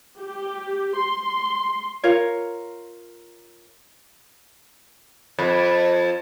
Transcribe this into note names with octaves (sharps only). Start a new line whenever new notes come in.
G4
C6
F4 A#4 C#5
F2